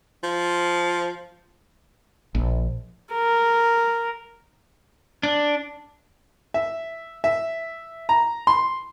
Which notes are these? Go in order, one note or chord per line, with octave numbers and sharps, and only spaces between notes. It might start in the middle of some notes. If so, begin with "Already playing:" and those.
F3
A#1
A#4
D4
E5
E5
A#5
C6